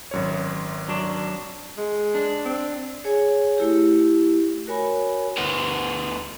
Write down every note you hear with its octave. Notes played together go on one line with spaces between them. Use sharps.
G#1 F#2 C#5
F#3 D4
G#3
D4
C4
G#4 C#5 G#5
A3 E4 G4
F#4 A#4 C#5 G#5 B5
D2 B3